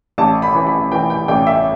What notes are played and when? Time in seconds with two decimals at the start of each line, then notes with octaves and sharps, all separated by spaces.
0.18 A1 A5
0.42 B5
0.55 E3
0.67 B5
0.92 E3 G5
1.10 G5
1.28 A1 G5
1.47 E5